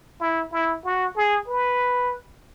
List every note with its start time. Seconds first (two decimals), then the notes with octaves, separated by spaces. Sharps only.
0.20 E4
0.52 E4
0.85 F#4
1.16 G#4
1.48 B4